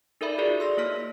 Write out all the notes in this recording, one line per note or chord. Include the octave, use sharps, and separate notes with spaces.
D#4 A4 A#4 D5 E5 B5
F4 F#4 G#4 D5 E5
C6 E6 A#6
A#3 E4 C#5 F6 B6